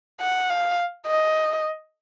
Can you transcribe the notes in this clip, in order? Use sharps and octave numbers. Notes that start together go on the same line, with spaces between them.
F#5
F5
D#5